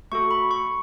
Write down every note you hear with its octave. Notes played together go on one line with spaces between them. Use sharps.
A3 F#4 A4 C#6
B5
C#6